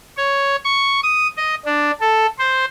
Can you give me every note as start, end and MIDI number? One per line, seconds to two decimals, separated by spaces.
0.17 0.56 73
0.65 1.00 85
1.03 1.27 87
1.37 1.55 75
1.66 1.91 62
2.00 2.26 69
2.39 2.65 72